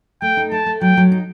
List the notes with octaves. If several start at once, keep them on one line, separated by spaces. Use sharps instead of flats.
A3 G5
D#4
A3 A5
A3
F#3 G5
F#3
D#4